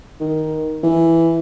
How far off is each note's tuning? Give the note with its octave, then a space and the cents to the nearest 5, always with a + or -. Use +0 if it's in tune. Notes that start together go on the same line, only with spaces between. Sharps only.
D#3 +5
E3 +5